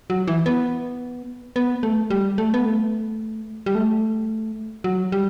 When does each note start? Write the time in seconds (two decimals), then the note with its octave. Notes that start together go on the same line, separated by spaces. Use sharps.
0.10 F#3
0.27 E3
0.46 B3
1.56 B3
1.83 A3
2.10 G3
2.38 A3
2.54 B3
2.65 A3
3.66 G3
3.75 A3
4.84 F#3
5.12 G3